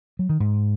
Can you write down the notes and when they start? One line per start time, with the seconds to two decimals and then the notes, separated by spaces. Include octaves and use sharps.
0.19 F#3
0.29 D#3
0.40 G#2